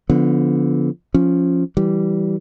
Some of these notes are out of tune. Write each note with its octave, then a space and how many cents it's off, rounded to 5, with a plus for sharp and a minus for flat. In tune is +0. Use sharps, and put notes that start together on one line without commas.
D3 -20 F3 +0 B3 +5
F3 +0 C#4 +0
E3 +0 G3 -15